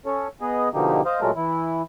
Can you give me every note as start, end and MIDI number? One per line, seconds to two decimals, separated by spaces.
0.06 0.28 61
0.06 0.28 69
0.06 0.28 73
0.41 0.69 59
0.41 0.69 68
0.41 0.69 75
0.74 1.01 47
0.74 1.01 50
0.74 1.01 53
0.74 1.01 58
0.74 1.01 63
0.74 1.01 67
1.05 1.20 72
1.05 1.20 75
1.05 1.20 77
1.21 1.31 46
1.21 1.31 54
1.21 1.31 56
1.21 1.31 57
1.21 1.31 69
1.21 1.31 70
1.36 1.82 52
1.36 1.82 64